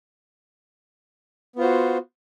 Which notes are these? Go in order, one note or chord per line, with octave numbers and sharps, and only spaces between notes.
B3 F4 F#4 C5